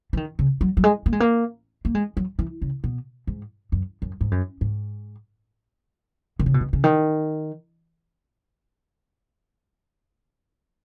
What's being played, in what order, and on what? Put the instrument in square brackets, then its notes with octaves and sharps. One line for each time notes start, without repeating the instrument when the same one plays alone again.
[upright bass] E3
D#3
C#3
F#3
F#3
G#3
A#3
G#3
A#3
A#3
G#3
F#3
E3
C#3
B2
G#2
F#2
F#2
G#2
F#2
G#2
D#3
C#3
B2
C#3
C#3
D#3